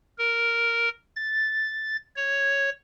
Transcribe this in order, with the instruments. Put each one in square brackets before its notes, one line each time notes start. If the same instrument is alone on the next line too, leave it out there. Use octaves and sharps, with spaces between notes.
[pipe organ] A#4
A6
C#5